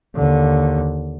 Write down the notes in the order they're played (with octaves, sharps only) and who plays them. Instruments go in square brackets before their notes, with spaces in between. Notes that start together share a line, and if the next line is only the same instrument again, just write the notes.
[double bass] D#2 D3